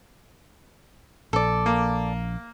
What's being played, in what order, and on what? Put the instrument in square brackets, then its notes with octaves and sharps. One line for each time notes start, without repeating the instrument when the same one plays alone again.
[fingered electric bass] A#1 [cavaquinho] A4 D5
[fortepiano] A#3